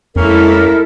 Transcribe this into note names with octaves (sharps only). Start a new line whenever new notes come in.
F2 G#3 A#3 C#4 E4 A4 A#4